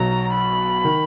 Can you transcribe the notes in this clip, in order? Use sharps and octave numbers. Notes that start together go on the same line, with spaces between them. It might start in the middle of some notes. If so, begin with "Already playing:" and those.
Already playing: B1 B2 F#3 A#5
B5
D#3